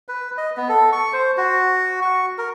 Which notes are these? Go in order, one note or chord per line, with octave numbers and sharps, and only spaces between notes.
B4
D#5
B3
A4
C#6
C5
F#4
C#6
A#4